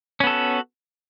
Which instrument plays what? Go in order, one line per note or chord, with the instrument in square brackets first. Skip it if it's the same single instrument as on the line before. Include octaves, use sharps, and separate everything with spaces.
[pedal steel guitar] C#4
B3
A4
F#4